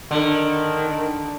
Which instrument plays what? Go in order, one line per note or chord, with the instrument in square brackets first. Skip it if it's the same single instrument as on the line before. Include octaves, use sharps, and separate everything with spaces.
[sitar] D3 [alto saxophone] D#3